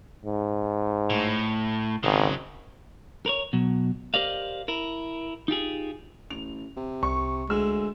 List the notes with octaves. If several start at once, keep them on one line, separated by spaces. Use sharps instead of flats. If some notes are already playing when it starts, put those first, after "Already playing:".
G#2
A2
G#1 C#3 F#3
A#4 B4 C#5
B2 F#3
G4 A#4 C5 D5 D#5 F5
E4 A#4
D#4 F4 G4 G#4
A1 F7
C3
C2 C#6
D2 G#3 E6